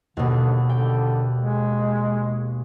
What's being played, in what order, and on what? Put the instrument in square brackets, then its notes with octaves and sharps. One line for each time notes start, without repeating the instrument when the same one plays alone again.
[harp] D#2 B2 [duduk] D3
[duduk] D3 [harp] G5
[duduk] G#3